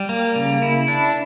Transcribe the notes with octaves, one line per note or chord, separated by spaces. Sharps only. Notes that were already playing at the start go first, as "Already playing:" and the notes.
Already playing: G3
A#3
C#3
E4
D4